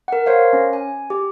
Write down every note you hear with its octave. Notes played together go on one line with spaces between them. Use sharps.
A#4 F#5
A#4 C5 C#5 F5
C#4
G#5
G4